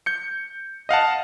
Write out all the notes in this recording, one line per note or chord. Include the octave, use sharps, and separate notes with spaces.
G6 C#7
D#5 F5 F#5 A5